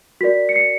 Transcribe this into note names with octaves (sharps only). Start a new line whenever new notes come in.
F#4 A#4 D5 B6
C#7
C7